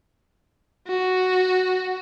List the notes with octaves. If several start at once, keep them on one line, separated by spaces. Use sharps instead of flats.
F#4